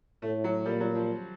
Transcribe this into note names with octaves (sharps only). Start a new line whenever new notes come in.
A2 A3
F#3
A#2 G3
F#3
F3